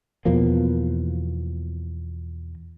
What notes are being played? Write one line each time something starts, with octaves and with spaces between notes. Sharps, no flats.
E2 B2 F3 A#3